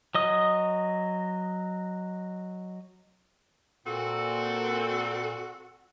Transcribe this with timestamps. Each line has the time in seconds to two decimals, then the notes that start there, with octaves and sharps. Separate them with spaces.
0.15 F#3 D#5 D#6
3.86 A#2 C4 F#4 A4